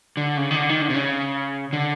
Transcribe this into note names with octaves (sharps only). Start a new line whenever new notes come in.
D3
C#3
D#3
D3
D#3
D3
C3
C#3
D3